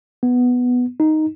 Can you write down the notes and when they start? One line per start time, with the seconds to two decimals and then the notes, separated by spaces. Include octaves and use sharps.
0.23 B3
1.00 D#4